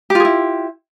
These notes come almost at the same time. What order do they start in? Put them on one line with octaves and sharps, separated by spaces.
G4 F4 G#4 E4